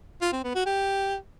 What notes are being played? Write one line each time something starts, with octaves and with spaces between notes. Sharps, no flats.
F4
C4
B3
F#4
G4